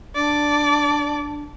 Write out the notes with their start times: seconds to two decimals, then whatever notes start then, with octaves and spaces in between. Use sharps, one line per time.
0.15 D4 D5